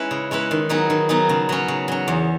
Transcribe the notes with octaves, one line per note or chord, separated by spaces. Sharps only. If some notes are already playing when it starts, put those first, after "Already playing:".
Already playing: G#3 C#4 E4 B4
C#3
G#3 C#4 E4 B4
D#3
F#3 B3 D#4 G#4
D#3
F#3 B3 D#4 G#4
C#3
F#3 C#4
C#3
F#3 C#4
E2